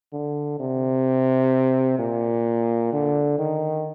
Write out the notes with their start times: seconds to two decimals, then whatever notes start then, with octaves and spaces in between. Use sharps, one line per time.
0.13 D3
0.60 C3
1.99 A#2
2.93 D3
3.39 D#3